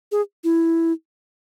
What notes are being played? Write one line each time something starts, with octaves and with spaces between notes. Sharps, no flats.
G#4
E4